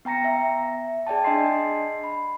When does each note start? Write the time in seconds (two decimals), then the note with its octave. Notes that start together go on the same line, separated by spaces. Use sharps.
0.05 B3 G5 A#5 A#6 C#7
0.24 E5
1.07 G#4 D5 G5 A5
1.24 D4 D#5 G#5 C6 C7
2.04 B5